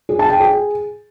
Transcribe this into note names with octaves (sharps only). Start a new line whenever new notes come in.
G#4
A5
G5
G#4